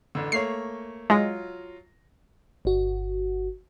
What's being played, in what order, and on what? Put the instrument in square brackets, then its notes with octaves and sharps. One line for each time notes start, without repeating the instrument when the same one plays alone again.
[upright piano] A1 D3
[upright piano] A3 A#3 C#5 [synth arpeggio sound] C7
[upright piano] F#3 F4 A#6 [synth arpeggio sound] G#3
[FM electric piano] G1 F#4